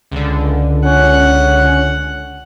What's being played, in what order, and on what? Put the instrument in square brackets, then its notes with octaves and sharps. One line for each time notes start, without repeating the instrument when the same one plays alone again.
[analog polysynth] C#2 D3
[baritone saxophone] C#4 [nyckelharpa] F#5